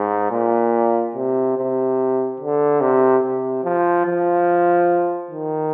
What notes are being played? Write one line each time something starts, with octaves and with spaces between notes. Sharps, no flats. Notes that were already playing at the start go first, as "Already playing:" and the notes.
Already playing: G#2
A#2
C3
C3
D3
C3
C3
F3
F3
D#3